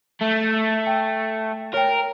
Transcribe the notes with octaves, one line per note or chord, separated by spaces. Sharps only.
A3
G5
A#4 C#5 G5